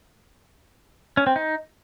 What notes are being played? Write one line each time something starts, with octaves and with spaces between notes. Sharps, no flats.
C#4
C4
D#4